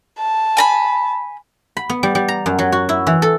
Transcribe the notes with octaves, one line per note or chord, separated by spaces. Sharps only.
A5
G#5 A#5 B5
B5
B3
G3
G3
A#5
F#2
F#3
F#4
E4
E3
A4